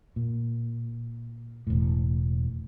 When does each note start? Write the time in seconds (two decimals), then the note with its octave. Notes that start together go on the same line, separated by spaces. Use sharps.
0.16 A#2
1.67 E1 A2